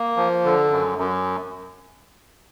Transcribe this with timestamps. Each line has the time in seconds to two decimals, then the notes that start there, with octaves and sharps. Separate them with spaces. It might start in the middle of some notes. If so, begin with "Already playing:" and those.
Already playing: A#3
0.17 F3
0.45 D3
0.71 F#2
0.98 F#2